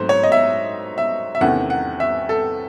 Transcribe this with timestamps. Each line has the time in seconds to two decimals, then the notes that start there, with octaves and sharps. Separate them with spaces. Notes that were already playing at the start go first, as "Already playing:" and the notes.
Already playing: G#2 F#3 A3 C4 C5
0.09 C#5
0.23 D#5
0.32 E5
0.98 E5
1.35 E5
1.41 E2 C3 D#3 A3 C#4 F#5
1.70 F#5
2.00 E5
2.29 A4